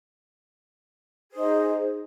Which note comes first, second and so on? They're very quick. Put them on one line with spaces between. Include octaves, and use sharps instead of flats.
G#4 C5 D#4 D#5